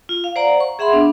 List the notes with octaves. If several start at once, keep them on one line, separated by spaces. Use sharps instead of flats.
F4
F5
C5 D5 F#5 A#5
C#6
G#4 E5 F#5 B5 C6
B3 D4